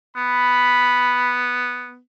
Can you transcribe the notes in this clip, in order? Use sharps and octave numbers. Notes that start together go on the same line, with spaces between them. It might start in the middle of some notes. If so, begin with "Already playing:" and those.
B3 B5